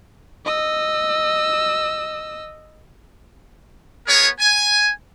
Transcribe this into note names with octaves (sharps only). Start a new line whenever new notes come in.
D#5 E6
B3 G#4 A#4 C#5
G#5